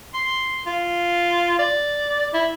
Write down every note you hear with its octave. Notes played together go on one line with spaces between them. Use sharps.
C6
F4
D5
E4